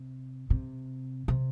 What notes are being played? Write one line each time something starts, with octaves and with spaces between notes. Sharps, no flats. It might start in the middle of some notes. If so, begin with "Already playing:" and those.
Already playing: C3
C3
C3